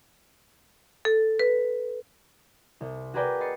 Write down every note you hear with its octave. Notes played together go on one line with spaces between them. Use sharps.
A4
B4
C2
F#4 G#4 A#4 B4 D5 G5
D#5 B5 A6 C7 C#7